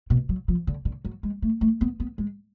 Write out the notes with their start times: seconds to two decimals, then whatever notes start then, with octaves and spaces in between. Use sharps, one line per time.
0.10 B2
0.29 F#3
0.48 F3
0.67 D3
0.85 D3
1.05 F#3
1.23 G#3
1.42 A3
1.61 A3
1.81 B3
2.00 B3
2.18 G#3